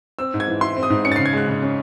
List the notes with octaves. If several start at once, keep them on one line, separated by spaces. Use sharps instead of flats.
C4 E6
G#2
G#6
E3
E4 C6
C4
D#6
G#2
C#4 C#7
A6
C#3 C7
G#6
G#3 F#6
C#3
C#4